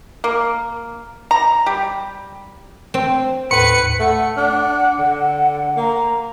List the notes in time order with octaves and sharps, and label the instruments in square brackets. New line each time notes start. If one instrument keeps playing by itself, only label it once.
[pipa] A#3
A#5
G3
[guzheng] C4 [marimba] G5
[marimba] D#2 A2 [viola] B4 [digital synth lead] C#7
[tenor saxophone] A3 [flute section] F#5
[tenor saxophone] D4
D3
[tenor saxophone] A#3 [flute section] A#5